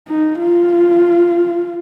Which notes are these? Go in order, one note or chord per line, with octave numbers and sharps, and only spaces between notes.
D#4
F4